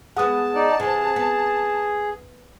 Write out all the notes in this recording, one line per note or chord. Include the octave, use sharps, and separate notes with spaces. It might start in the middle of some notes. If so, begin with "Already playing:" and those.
G#3 B3 F#5 A5 D#6
D#4 D5
C3 E3 G#4
B3